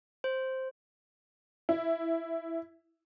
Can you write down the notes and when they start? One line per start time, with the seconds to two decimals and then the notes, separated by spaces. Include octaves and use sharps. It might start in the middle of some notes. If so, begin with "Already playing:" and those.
0.24 C5
1.69 E4